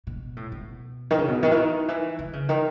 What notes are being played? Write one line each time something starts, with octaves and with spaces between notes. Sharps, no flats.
B2
A2
B2
D#3
C#3
B2
D#3
E3
D#3
E3
D#3
C#3
D#3